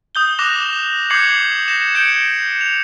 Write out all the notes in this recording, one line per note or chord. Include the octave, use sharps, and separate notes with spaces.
D#6 G6 G7
D6 F#6 A#6 E7 F7
D6 G6 G#6 C7 C#7 F#7
G6 A#6 E7
G6 C#7 D7 E7 G7
F7